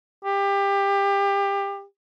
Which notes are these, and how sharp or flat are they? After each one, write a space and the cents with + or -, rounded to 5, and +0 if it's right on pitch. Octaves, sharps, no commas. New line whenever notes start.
G4 +25